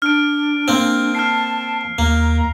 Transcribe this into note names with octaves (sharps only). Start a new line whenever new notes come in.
D4 F6 D7
A#3 C4
A5 F6 C7
D#2 A#3 A#5